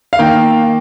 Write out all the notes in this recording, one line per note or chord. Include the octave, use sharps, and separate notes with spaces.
F5
D#3 A#3 G5